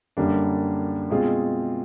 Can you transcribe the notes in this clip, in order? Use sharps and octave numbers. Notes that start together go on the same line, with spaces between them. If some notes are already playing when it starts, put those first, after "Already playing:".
F#2 D3 G3 A#3 D4
B2 G#3 C4 F4 G#4